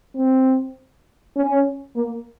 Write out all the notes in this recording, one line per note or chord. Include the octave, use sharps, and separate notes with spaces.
C4
C#4
A#3